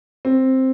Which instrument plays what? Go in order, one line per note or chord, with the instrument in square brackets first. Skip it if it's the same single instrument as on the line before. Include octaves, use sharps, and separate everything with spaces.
[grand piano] C4